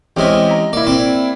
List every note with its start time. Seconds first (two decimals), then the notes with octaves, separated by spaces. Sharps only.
0.16 E2 G#3 C4 C#4 G4 G#5
0.51 A#5
0.73 A#3 E4 D5
0.87 C4 D5